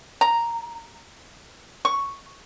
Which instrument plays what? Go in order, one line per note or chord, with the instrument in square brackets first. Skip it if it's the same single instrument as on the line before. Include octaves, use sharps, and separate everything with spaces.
[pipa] A#5
C#6